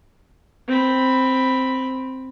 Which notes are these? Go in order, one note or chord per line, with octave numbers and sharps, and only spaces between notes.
C4 B5